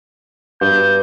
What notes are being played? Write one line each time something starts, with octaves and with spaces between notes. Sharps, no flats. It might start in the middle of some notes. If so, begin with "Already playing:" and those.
G2 G6